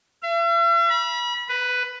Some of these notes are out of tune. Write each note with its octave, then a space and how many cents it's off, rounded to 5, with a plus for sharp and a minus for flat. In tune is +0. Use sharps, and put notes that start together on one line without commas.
E5 +45
B5 -35
B4 +10